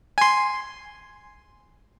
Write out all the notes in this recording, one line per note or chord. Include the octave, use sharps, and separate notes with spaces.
G#5 C6